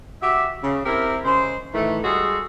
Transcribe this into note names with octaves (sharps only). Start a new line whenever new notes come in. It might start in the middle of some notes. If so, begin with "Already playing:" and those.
F#4 G4 E5
C#3
C4 E4 G4 A#4
C#3 G#3 C5
A2 D#3 E3 A3
G3 G#3 F#4 G#4 A4